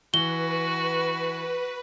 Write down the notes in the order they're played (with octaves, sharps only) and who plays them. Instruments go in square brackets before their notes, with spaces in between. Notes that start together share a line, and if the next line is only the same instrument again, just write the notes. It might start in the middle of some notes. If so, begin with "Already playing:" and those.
[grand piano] E3 [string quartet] F#4 [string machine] B4 [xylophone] G7